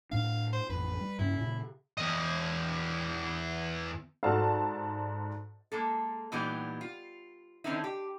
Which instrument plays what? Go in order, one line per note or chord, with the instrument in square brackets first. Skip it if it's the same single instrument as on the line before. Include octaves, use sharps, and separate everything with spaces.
[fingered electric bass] A2 D4 [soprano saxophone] F5
[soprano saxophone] C5
[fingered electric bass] A1 F2 [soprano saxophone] B4
[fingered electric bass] G3
[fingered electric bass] G2 C#3 C#4 [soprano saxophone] E4
[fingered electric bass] A#2 C#3
[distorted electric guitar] E2 D#5
[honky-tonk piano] G#2 D5 A5 [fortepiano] F#4 A4 F5
[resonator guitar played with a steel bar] G#3 A#3 A4
A#2 E3 G3 B3 D#4 G4
F4
D3 D#3 C4 C#4 D#4 E4
G4